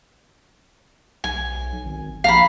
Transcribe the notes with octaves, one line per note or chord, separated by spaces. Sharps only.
B1 G#5
G#1
A#1 F5 A#5 B5